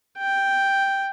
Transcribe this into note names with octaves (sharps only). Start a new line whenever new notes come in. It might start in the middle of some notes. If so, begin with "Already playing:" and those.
G5